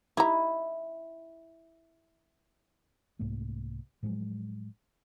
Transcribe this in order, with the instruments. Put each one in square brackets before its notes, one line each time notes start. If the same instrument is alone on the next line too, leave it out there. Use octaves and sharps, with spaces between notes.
[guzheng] E4 D#5 [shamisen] G4 A#5
[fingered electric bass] C2 G#2 A3 A#3
A2 F3 F#3 G#3